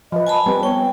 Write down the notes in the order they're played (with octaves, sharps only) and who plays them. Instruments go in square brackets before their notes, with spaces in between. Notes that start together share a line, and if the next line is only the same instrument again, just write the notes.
[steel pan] F3 B4 [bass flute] D#5
[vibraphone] G#5 A5 B5
[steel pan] G3 C4 [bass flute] B4
[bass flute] B3 [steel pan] C#5 [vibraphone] G5